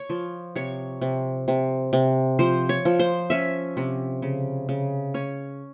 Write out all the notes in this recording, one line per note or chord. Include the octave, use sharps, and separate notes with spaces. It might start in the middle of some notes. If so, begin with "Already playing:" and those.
Already playing: C#5
F3
C3 C#5
C3
C3
C3
F3 C5
C#5
F3
C5
C#4 E5
C3
C#3
C#3
C#4 C#5